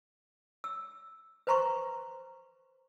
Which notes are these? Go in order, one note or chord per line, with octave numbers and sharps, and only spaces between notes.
E6
B4 C5 A#5 C6 C#6